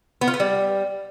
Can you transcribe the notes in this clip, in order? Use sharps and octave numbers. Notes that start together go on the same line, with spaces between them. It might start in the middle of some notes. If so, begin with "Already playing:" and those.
B3
F4
B3
G3